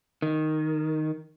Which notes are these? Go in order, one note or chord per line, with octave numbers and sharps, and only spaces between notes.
D#3